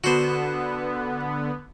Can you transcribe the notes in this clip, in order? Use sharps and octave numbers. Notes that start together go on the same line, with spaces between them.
D3 B3 F#4 C5